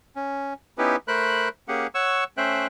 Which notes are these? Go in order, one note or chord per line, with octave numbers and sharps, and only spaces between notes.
C#4
B3 C#4 D#4 E4 G4 B4
A3 A#4 C5 B5 F#6
A#3 C#4 G4 G#4 F#5
C#5 F#5 C#6 E6
A3 C#4 C5 E5 G5 F#6